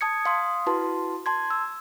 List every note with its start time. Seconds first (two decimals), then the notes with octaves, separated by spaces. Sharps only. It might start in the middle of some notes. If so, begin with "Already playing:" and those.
0.01 A5 D#6 G#6 C#7
0.25 F5 C6 D#6
0.66 E4 F#4 B4 A5 C6
1.26 A5 C6 G#6
1.50 E6